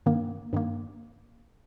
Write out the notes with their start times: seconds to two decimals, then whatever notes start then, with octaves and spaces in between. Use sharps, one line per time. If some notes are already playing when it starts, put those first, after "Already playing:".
0.06 G2 D#3 A#3
0.53 G2 D#3 A#3